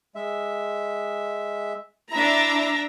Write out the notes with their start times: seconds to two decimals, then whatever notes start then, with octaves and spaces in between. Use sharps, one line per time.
0.15 G#3 E5
2.11 D4 E4 E5 A#5